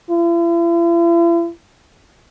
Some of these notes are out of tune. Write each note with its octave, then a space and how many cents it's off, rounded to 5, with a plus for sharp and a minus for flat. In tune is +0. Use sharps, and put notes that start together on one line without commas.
E4 +45